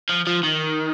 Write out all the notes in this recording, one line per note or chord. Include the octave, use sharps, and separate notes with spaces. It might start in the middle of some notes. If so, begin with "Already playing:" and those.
F3
F3
D#3